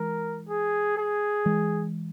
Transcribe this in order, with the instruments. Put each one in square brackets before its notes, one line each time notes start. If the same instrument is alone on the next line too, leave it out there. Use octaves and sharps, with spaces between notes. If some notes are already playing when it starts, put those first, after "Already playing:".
Already playing: [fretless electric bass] E3 G#3 [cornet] A#4
[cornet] G#4
G#4
[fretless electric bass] E3 G#3